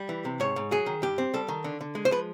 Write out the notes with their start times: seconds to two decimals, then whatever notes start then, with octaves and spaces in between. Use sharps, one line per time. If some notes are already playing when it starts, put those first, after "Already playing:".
Already playing: G3
0.09 E3
0.25 C3
0.40 G#2 C#5
0.56 G#2
0.71 F#3 G#4
0.86 D#3
1.02 G2 G4
1.18 C4
1.34 G3 A4
1.48 D#3
1.64 D3
1.81 D3
1.95 G#3
2.05 C5
2.11 F3 B4